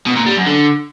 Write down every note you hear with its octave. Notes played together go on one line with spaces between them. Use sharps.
B2
A#2
G3
F#2
D3